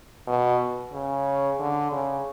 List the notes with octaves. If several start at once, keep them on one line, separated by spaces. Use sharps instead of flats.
B2
C#3
D3
C#3